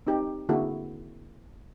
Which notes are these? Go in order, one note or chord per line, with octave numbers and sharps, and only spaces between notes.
C4 D#4 G4
D3 A#3 C4 E4 F#4 G#4